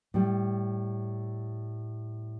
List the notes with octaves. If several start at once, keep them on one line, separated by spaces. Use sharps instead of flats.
A2 G3